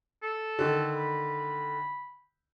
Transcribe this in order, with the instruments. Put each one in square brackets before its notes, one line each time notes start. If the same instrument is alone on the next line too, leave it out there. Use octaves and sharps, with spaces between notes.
[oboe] A4
[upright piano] D3 D#3
[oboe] B5